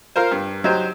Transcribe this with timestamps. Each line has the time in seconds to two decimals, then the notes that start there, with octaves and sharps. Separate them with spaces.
0.16 F4 A#4 C5
0.31 G2
0.64 F#3 D#4 G4 C5